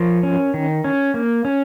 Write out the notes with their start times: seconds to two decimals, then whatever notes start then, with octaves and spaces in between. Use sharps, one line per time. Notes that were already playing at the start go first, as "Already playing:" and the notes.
Already playing: F3 A#4 C#5
0.23 C#4
0.54 D#3
0.84 C#4
1.14 A#3
1.45 C#4